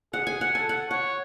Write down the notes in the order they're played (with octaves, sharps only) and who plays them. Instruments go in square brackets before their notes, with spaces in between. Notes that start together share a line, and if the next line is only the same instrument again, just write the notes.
[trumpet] G#4 [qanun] F#5
[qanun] G#5
F#5
[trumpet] A4 [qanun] G#5
[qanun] F#5
[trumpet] C#5 [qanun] F#5